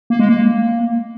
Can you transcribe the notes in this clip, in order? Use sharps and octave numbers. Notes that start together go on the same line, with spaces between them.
A#3
G#3
A#3